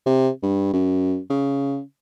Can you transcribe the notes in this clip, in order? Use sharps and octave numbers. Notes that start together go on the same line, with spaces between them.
C3
G2
F#2
C#3